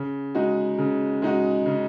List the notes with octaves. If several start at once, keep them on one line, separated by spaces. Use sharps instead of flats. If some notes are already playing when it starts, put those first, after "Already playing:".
Already playing: C#3
G#3 D#4 F#4
C#3
G#3 D#4 F#4
C#3